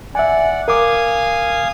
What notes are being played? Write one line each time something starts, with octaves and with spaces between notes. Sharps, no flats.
D5 E5 F#5 G#5
A#4 F5 G#5 D6 D#6